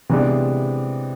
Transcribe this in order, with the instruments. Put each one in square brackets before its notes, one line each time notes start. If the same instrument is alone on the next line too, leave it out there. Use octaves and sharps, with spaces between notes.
[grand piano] C3 E3 G#3 B3 D4